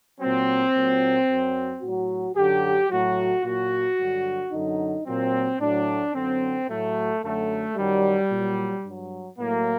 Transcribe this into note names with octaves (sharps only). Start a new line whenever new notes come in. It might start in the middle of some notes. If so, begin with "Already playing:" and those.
A#2 F#3 C4
A#2 F#3
F#2 F#3
A2 F#3 F#4
F#2 D3 F#3 G4
A2 F#3 F#4
A#2 F#3 F#4
G2 D3 F#3
F#2 D3 F#3 D#4
A#2 F#3 C4
A2 F#3 D4
F#2 D3 F#3 C4
A2 F#3 A3
F#2 D3 F#3 A3
F#2 D#3 F#3 G3
A#2 F#3
G2 F#3
A2 F#3 A#3